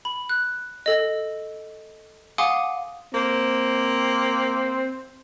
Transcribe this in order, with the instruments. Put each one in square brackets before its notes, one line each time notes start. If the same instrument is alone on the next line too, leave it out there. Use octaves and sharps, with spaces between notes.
[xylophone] B5
F#6
A4 D#5
F5 F#5 G#5 C6 D6 D#6
[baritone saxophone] A#3 [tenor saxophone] C4